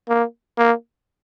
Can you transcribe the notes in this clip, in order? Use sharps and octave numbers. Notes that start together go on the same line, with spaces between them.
A#3
A#3